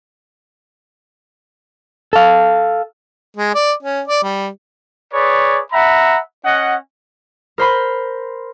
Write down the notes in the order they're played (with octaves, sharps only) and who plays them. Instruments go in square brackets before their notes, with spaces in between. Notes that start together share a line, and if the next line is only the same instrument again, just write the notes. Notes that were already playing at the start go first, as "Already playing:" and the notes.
[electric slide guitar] A4 F5
[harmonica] G#3
D5
C#4
D5
G3
[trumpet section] G#4 B4 C#5 D5
E5 F#5 A#5 B5
C#4 D#5 F#5
[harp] A#4 C5 B5 C6